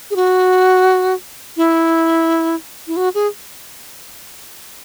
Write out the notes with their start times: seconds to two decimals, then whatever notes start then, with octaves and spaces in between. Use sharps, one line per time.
0.11 G#4
0.16 F#4
1.57 E4
2.87 E4
2.97 F#4
3.15 G#4